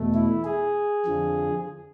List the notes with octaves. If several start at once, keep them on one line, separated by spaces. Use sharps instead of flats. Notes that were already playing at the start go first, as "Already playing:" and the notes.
Already playing: E2 B2 A3
E4
G#4
F2 D3 F3